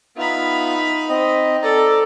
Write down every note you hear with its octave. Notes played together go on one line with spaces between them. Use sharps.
B3 D#4 F4 E5 B5
C4 D#5
A4 D5 A#5